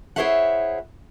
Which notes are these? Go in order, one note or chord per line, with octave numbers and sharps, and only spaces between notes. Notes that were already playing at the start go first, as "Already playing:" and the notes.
E4 G#4 C5 C#5 E5 F#5